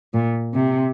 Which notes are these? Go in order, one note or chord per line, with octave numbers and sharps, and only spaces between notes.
A#2
C3